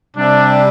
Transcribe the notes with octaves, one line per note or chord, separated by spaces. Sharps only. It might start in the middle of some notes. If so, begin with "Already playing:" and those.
C3 G3 D4